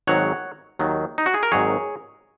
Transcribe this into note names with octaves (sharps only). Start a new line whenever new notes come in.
G#1 G#2 D#3 F#3 C#5 F#5
D#2 D#3 F#3
D#4
F#4
G#4
A#4
G#1 G#2 D#3 F#3 G#4 C#5